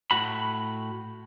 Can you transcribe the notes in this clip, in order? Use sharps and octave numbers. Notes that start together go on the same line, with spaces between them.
A2 F#4 B5